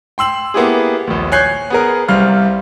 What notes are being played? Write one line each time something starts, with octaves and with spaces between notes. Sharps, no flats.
G5 C6 E6 F#7
A#3 B3 E4 G4 G#4
A#1 D#2
C#5 G#5 F#6 G6 C7
B3 G#4 A#4
C2 G3 C5 F5 F6